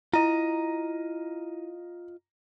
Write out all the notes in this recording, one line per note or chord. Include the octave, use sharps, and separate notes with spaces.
E4 F4 D#5 A#5 D#7